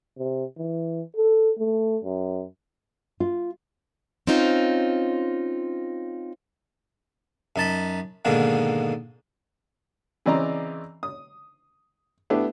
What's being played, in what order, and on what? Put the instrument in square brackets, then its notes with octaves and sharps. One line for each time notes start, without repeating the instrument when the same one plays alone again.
[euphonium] C3
E3
A4
A3
F#2
[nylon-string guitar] F4
[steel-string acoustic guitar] C4 C#4 D#4 F4 C5
[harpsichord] F#2 D#4 A5 B5
G#2 B2 D3 D#3 A#3
[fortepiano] C#3 E3 C4 D5 D#5 A#5
D#6
A3 B3 D4 E4 G4